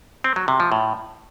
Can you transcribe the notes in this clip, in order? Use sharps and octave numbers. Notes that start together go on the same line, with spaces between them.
C4
F#3
C3
F3
A2